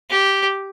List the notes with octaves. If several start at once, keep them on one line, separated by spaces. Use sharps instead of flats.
G4